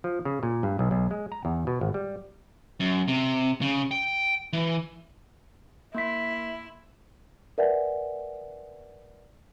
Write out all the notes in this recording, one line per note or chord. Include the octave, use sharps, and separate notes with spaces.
F3
C#3
A#2
G2
B1
B1
G#3
A#5
E2
B2
G#1
G3
F#2
C3
C#3
G5
E3
A#3 E4 C6 B6
A#4 B4 D5 E5 F#5 G#5